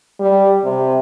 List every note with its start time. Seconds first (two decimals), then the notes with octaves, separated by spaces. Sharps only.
0.20 G3
0.64 C3